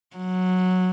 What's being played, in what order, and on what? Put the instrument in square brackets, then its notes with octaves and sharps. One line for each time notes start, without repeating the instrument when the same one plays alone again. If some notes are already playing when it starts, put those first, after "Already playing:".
[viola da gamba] F#3